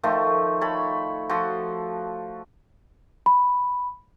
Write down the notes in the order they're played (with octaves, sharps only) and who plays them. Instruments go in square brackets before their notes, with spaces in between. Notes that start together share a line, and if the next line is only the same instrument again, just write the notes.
[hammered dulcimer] D#3 F3 A3 A4
A4 C#5 B5
F3 F#4 A4
[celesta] B5